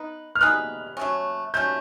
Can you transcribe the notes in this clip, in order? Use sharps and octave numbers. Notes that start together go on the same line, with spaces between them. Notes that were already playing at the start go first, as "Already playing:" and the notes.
Already playing: B3 D#4 B4
F6
B3 D#4 G#4 B4 F#6
F#3 A3 C#4
F#3 A3 C#4 G6